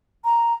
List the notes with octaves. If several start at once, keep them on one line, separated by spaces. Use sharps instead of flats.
A#5